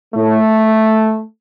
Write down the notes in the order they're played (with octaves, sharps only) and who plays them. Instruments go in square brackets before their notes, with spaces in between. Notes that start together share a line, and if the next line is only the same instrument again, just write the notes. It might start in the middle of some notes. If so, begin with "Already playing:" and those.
[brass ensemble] A2 A3